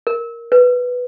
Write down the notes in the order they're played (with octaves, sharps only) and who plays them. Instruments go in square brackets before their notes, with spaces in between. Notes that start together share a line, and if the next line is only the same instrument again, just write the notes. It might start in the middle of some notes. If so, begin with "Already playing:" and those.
[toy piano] A#4
B4